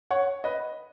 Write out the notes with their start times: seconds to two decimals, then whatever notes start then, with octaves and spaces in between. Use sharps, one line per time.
0.11 C#5 F#5
0.44 B4 D#5